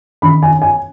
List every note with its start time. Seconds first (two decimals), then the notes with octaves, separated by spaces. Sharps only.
0.22 D#3 B5
0.43 G#5
0.50 C#4
0.62 G#5